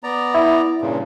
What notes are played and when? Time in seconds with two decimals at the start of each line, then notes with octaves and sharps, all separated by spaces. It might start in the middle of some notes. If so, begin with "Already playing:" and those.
0.03 B3 D5 A#5
0.34 E4
0.81 G2 A#2 C#3